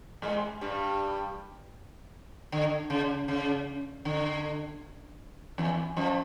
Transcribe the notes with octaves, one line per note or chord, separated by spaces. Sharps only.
G#2 G#3
G2 G3
D3
C#3
C#3
D3
E2 E3
F2 F3